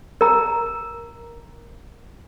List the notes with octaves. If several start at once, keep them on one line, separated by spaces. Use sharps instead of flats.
A#4 A#5